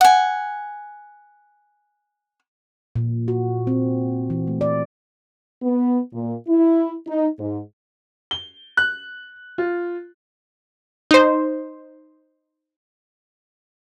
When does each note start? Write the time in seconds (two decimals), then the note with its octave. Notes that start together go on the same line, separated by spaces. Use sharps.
0.01 F#5 G#5
2.96 A#2
3.28 F#4
3.67 C4
4.30 E3
4.47 A3
4.61 D5
5.62 B3
6.13 A#2
6.48 E4
7.07 D#4
7.39 G#2
8.31 G7
8.77 F#6
9.58 F4
11.11 D#4 C5